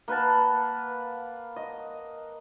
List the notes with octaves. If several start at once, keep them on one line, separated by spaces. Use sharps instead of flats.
A#3 B4 F#5 A5
D#5